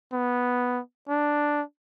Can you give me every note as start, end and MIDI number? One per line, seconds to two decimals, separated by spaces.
0.13 0.80 59
1.09 1.62 62